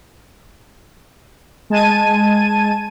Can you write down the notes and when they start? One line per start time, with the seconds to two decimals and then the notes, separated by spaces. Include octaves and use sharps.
1.70 G#3 A5 G#6 D#7